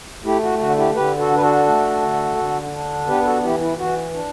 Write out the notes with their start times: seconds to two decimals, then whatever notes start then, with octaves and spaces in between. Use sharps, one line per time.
0.24 A3 E4 G4
0.42 F#4
0.59 D3 F#4
0.77 E4 G4
0.95 D3 G4 B4
1.18 F#4 A4
1.31 D4 B4
1.42 F#4 A4
1.66 A3
2.02 D3
2.37 D3
2.73 D4
3.08 B3 G4 B4
3.21 B4
3.25 F#4 A4
3.43 E3 E4 G4
3.61 E4
3.78 E3 F#4
4.14 D4